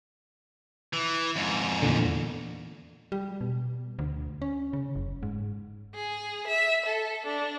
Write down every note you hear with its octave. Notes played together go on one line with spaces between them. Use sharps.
E3
F2 G#2
E2 A#2 D3
G3
B2
D2
C#4
C#3
F#1
G#2
G#4
E5
A4
D4